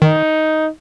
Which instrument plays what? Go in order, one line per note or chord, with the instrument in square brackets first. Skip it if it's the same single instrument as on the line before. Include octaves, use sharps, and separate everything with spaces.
[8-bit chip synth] D#3 [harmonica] D#4